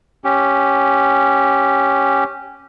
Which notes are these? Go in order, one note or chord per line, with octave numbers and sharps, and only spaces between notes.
C#4 G4